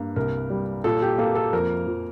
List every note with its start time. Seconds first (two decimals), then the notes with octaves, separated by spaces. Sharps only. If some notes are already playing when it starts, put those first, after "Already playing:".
Already playing: G2 A#3
0.16 C2 A#4
0.50 G3
0.84 A#2 A4
1.02 G4
1.18 A#3 A4
1.35 A4
1.53 F2 A#4
1.87 F3